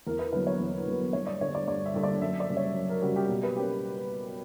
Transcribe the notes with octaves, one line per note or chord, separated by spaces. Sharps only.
E2 A#4
B4
D3 F#3 B3 B4
C#5
E2
D3 F#3 B3
G2 C#5
D5
D3 G3 C#5
D5
G2 D5
E5
D3 G3
D5
F#2 E5
D5
C#3 G3
C#5
F#2
A#4
C#3 G3 F#4
G4
B2 G4
B4
A#3 C#4 G4